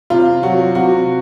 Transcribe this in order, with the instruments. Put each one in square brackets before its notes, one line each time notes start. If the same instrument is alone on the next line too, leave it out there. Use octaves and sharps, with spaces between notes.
[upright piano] C3 F4
F#3 F#4
C3 F#4